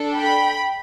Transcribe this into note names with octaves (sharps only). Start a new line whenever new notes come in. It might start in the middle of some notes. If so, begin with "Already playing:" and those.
Already playing: D4 A4
G5 B5